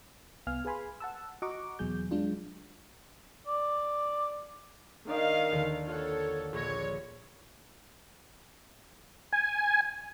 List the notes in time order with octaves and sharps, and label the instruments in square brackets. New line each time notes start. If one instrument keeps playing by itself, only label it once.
[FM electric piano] C2 B3 F5 G#5 F6
G#4 B4 F5 G#5 B5 C6
F#5 A5 E6
F#4 D#5 F#5 A#5 C#6 D6
E2 B2 F#3 G#4 G6
F#3 G#3 D4 F4
[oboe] D5
[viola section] D#3 F5 [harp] D4 D5 D#5
[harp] D#2 D3
[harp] F4 F5 F#5 [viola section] A4 C#5
[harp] A#1 A#6 [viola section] C#5
[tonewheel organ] G#5